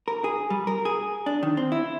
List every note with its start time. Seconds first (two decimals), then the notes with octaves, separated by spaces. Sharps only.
0.08 A#4
0.24 G#4
0.50 G3
0.67 A#4
0.85 G#4
1.26 D4
1.43 D#3
1.57 C4
1.72 E4